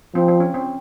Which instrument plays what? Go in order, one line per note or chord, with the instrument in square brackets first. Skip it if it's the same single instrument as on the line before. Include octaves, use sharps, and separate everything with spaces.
[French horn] F3 [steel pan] C4
[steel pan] C4
C#4
C4